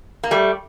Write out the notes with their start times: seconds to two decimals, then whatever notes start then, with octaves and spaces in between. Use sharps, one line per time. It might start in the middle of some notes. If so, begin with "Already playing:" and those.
0.24 A#3
0.31 G3 A3